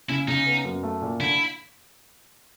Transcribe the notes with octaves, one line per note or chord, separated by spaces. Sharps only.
C#3 E4
C#3 D#4
B3
F#2
A3
A#2
D3 E4